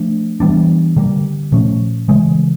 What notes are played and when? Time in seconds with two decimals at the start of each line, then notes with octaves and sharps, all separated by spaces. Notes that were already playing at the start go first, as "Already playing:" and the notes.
Already playing: F3 A3 D4
0.40 E3 G3 B3 D4
0.97 D3 G3 A#3
1.52 A#2 F3 A3 C#4
2.08 C#3 E3 G#3